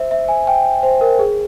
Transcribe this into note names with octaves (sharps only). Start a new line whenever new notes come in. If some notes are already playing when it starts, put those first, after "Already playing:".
Already playing: C5 E5
E5
G#5
G5
C5
A#4
G#4